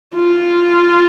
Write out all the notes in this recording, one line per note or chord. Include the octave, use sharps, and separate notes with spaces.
F4